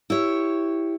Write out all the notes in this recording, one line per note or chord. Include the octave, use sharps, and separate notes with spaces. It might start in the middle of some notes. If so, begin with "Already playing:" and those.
E4 G4 C#5